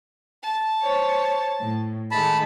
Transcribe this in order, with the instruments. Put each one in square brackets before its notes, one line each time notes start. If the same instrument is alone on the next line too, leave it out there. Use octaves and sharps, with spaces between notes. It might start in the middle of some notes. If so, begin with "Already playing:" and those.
[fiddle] A5
[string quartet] C5 C#5
A2
[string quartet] D#3 G#3 A3 [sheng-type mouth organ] A5 B5